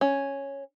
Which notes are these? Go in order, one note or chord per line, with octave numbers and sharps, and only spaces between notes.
C#4